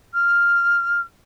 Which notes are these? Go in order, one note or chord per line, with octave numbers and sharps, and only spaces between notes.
F6